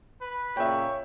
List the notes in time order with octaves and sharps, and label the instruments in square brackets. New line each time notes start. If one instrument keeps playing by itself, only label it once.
[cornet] B4
[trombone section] A#2 C#3 [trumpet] C#5 [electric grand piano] E5 G5